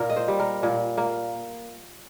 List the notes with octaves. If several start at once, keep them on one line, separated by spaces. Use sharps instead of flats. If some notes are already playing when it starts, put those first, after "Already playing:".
Already playing: A#2 A#4
D#5
C5
G3
A#4
A#2
A#3